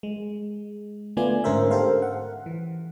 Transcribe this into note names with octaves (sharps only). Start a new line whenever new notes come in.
G#3
D3 A3 B3 F4 D5 G#5
G#2 D3 C#4 A#4 C5 E5
G4 A4 A#4 C5 F5
F#5
E3